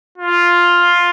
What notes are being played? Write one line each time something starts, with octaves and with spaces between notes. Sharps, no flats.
F4